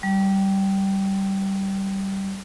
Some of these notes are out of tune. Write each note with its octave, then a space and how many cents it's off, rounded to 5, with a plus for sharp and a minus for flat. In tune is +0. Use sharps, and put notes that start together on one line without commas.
G3 -15